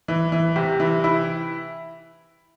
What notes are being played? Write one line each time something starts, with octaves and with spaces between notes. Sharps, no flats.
E3
E3
C3
E3
E4